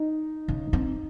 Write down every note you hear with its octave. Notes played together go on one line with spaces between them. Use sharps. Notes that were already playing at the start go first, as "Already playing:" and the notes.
Already playing: D#4
C#3
C4